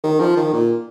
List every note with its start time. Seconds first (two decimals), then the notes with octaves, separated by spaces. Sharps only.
0.04 D#3
0.20 F3
0.37 D#3
0.54 A#2